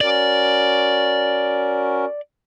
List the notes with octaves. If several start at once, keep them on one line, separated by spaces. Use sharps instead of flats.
C#4 F#4 A#4 D5